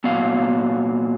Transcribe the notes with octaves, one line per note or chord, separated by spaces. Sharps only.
A#2 F#3 B3 F5